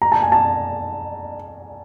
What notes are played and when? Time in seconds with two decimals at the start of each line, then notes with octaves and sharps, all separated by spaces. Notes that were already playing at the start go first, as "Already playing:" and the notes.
0.02 A#5
0.12 A5
0.22 G#5
0.32 A5